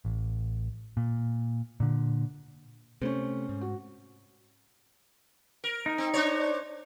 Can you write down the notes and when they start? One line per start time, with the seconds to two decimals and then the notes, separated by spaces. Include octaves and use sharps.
0.05 A1
0.97 A#2
1.80 A#2 D3
3.02 C3 A3 C#4 C5
3.49 G#2
3.61 F#4
5.64 A#4
5.86 D#4
5.98 C4
6.14 D4 C5 C#5